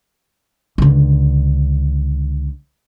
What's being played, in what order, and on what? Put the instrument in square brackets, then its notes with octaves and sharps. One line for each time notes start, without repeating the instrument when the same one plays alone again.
[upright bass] C#2 D3